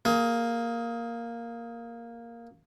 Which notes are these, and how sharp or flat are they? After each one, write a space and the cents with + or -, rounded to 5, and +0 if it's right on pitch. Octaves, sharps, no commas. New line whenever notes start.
A#3 +0 G#4 +20